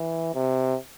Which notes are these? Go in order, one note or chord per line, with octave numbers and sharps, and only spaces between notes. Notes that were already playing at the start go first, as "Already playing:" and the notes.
Already playing: E3
C3